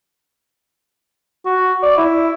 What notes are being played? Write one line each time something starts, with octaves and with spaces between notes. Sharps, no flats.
F#4
D5
E4